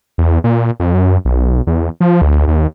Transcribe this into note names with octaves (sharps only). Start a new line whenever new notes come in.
E2
A#2
F2
F#2
B1
E2
F3
D2
D#2